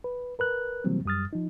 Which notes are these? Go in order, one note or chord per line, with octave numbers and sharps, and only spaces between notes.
B4
A#4 B4 F#6
C3 E3 F#3 G3 A#3 C4
F#2 G3 D#6 F6 A6
F3 D#4